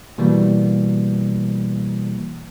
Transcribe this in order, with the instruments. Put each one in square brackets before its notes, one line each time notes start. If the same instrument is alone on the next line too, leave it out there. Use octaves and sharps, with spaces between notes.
[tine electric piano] B2 E3 G3 A#3